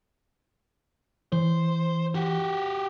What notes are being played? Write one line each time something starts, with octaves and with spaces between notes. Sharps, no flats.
E3 C5
F#4 G4